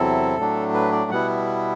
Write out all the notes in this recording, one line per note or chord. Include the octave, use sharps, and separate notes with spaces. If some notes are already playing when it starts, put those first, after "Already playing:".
Already playing: E2 C3 F#3 C4 E4 A4
A2 F#3 A3 D4
B4
D5
B2 G3 B3 E4 F#5